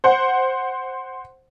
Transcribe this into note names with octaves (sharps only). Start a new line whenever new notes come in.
C5 F#5